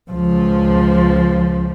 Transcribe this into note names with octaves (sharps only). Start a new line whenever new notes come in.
C#2 F3